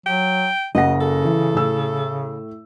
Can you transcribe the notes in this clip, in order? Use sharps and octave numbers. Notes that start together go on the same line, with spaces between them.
F#3 G5
F#1 C#3 D#5 F#5 A#6
A4
E3
A2 E6